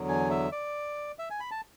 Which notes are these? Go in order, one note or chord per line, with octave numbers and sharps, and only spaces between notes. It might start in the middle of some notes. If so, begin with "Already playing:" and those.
Already playing: E2 D3 F#3
G#5
E5
D5
E5
G#5
B5
A5